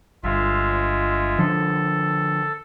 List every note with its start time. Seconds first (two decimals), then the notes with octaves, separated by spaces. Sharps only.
0.24 G1 G#3 F4 E5
1.38 D3 F3 A4